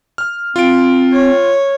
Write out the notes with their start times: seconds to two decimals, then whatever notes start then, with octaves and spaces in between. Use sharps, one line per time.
0.18 F6
0.56 C4 F4 D7
1.12 C#5